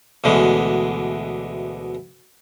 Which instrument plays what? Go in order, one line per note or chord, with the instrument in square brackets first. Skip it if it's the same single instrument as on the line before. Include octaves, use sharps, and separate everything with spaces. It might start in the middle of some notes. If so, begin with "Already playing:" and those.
[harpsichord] D2 B2 D3 E3 G#3